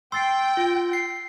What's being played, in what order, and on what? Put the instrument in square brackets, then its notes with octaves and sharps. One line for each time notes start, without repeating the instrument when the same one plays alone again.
[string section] G5 [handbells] C6 [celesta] E6 A6 C7
[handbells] F4
C7